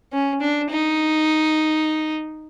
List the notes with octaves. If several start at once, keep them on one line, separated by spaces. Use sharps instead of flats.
C#4
D4
D#4